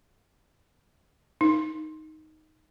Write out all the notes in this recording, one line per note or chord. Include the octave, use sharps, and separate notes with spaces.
D#4